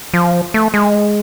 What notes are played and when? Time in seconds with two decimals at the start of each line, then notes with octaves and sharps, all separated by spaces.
0.14 F3
0.54 A3
0.74 G#3